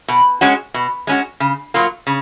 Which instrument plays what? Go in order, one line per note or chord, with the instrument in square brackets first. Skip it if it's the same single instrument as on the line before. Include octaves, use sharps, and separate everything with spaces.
[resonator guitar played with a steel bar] B2
G#3 C#4 F#4
B2
G#3 C#4 F#4
C#3
F#3 A#3 F4
C#3